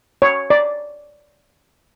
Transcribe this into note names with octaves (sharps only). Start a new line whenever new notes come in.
C#5
D5